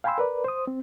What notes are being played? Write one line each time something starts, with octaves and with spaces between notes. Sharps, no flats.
F5 G5 G#5 B5 C6 E6
A#4 B4 D5
C5 D#6
C4